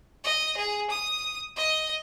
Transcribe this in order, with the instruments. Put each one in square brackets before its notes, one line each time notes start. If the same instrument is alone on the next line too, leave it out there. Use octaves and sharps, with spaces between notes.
[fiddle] D#5
G#4
D#6
D#5